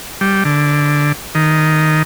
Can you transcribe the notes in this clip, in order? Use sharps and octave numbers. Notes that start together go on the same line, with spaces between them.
G3
D3
D#3